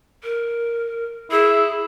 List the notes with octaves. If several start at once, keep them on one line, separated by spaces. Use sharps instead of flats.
A#4
E4 G#4